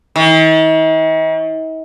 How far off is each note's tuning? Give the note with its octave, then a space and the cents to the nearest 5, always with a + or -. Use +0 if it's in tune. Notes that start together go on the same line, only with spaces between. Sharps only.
D#3 +45